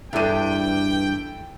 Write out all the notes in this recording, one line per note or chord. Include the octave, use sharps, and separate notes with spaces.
E2 G2 E4 A4 G5 D#7